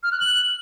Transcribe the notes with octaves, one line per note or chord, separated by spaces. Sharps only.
F6
F#6
F#7